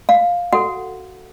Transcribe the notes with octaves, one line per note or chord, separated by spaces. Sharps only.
F5
F#4 A4 F#5